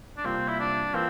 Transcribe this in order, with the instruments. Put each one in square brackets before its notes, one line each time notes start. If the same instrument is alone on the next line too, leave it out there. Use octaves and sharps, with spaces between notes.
[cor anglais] D4
[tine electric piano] C3 G3 A#3 F4 [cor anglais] C4
[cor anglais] E4
D4
[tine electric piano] E3 A#3 F4 [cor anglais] C4